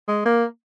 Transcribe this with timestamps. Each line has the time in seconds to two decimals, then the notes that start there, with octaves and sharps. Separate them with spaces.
0.08 G#3
0.26 A#3